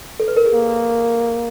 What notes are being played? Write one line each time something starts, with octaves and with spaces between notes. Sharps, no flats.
A4
B4
A#4
G#4
A#3